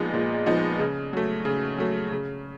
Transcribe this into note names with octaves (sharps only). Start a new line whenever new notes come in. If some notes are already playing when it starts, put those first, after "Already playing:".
Already playing: A#2 F3 G#3 B3 D#4
A#2
F3 G#3 B3 D#4
C#3
F#3 A3
C#3
F#3 A3
C#3